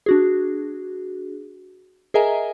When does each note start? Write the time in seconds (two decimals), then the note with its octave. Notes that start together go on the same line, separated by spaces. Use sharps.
0.06 D4 F#4 G#4
2.14 G#4 A#4 D#5 E5 G#5 A#5